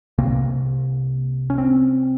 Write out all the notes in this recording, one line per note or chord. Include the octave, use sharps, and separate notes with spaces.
C2 C3 A#3
C#4
C4